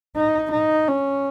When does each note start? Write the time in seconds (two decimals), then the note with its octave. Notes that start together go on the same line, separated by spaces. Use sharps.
0.16 D#4
0.52 D#4
0.88 C#4